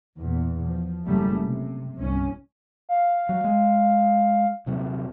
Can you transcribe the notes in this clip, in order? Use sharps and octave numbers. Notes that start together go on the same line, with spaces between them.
E2 A#2
F3
F#1 F#2 C#3 G3 A3
C3
G1 C2 C#4
F5
F#3
G#3
D#1 C3 F#3